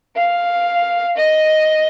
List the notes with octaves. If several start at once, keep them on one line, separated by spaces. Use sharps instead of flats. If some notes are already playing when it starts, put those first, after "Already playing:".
F5
D#5